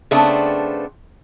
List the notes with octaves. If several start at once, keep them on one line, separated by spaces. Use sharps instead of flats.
C#3 A3 B3 C4 D4